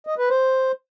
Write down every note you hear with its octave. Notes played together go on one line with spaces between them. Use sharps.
D#5
B4
C5